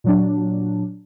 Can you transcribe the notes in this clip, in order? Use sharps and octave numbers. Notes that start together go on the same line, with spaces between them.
A#2 F#3 D4